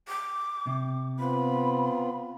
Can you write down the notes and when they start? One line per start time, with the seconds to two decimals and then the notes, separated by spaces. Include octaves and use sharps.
0.08 D6
0.67 C3
1.19 B3 C4 F4 B5